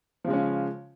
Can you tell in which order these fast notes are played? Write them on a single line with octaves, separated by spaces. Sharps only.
F3 C#3 G#3 C#4